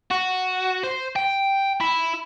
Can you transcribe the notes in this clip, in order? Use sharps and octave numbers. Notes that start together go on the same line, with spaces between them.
F#4
C5
G5
E4